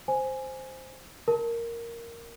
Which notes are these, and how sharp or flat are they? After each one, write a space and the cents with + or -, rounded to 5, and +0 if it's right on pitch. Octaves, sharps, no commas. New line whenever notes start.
C5 +0 G#5 +0
A#4 +0 A5 +0